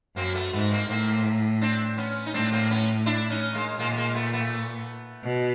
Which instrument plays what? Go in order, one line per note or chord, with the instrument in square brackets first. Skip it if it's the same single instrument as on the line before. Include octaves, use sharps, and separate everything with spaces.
[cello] F#2 [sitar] A#3 C4
[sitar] A3 B3
[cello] G#2 [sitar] A3 B3
[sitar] A#3 C4
[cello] A2 [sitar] A#3 C4
[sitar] C4 D4
B3 C#4
D#4
[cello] A2 [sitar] C4 D4
[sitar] A#3 C4
B3 C#4
D4 E4
C#4 D#4
G#3 A#3
[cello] A#2 [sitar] G#3 A#3
[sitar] B3
G#3 A#3
A3 B3
A3 B3
[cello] B2